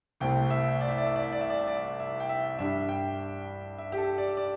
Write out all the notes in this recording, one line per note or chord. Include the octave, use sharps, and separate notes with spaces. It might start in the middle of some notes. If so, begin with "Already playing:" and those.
C2 C3 A3 C4 G5
E5
D5
E5
D5
E5
D5
E5
D5
E5
D5
E5
D5
E5
G5
E5
G2 G3 D4 E5
G5
E5
G4
A4
D5
D5